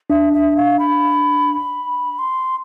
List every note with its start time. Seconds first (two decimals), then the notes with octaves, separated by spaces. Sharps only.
0.10 D4 E5
0.33 E5
0.57 F5
0.79 B5
2.19 C6